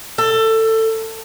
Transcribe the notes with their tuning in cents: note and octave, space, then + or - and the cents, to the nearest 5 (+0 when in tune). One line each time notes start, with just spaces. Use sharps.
A4 +20